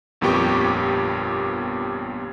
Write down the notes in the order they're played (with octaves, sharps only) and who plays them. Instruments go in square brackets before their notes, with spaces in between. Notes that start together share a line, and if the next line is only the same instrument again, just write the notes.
[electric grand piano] G1 F2 A#2 B3 G4 C#6